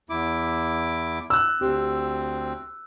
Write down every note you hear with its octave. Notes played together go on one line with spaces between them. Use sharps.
E2 E4 D6
E6 F#6
D2 C4 G4